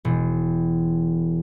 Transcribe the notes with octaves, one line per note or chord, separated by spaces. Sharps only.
E1